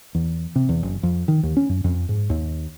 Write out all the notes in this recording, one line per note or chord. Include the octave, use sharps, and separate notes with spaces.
E2
C3
E2
F#1
F2
D#3
D#2
C#4
F#2
F2
G#2
D#2